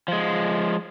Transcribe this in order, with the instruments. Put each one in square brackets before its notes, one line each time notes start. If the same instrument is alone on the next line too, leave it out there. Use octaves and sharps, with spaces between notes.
[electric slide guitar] F3 G#3